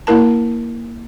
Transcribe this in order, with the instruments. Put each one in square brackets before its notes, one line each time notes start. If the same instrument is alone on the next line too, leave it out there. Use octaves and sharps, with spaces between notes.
[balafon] A#3 E4 A#4 A5